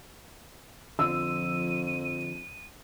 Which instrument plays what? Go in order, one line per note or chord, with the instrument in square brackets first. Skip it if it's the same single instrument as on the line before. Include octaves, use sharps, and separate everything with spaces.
[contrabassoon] F2 [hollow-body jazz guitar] D3 F3 [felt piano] E6 [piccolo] D#7